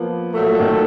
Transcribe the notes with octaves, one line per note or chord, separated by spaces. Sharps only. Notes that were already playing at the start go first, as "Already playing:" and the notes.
Already playing: F3 A#3 B3
A#2 F#3 A3
D#3